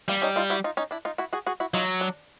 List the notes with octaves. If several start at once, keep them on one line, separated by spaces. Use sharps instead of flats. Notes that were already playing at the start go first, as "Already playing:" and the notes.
G3 A#3
C#4 D#4
D#4 F4
E4 F#4
D#4 F4
C#4 D#4
D4 E4
D#4 F4
E4 F#4
F#4 G#4
F#4 G#4
E4 F#4
F#3 D#4 F4
D4